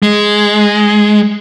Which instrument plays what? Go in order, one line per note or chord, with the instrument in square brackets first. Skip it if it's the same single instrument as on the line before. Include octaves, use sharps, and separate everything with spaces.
[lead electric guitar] G#3